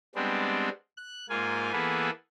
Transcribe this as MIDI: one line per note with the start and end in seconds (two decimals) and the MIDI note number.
0.15 0.69 55
0.15 0.69 56
0.15 0.69 59
0.15 0.69 60
0.15 0.69 62
0.97 1.26 90
1.29 1.72 44
1.29 1.72 58
1.29 1.72 65
1.29 1.72 80
1.72 2.10 52
1.72 2.10 58
1.72 2.10 59
1.72 2.10 68
1.72 2.10 69
1.72 2.10 71